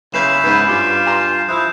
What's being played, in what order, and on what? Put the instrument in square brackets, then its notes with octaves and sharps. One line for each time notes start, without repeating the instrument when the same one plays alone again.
[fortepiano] B1 B4 [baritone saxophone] C#3 [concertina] E4 B5 [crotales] G6 C7 E7
[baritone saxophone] G#2 [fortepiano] B3 C#4 B4
[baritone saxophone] G2 [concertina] F4 F5 [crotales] D6
[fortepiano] G#5 A#5 C6
[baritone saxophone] F3 [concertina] E4 [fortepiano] D#6 E6 [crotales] F#6 G6